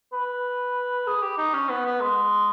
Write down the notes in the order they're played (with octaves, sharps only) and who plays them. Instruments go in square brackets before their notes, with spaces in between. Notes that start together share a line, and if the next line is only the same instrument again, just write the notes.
[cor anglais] B4
G#4
G4
D#4
C#4
B3
B3
G#3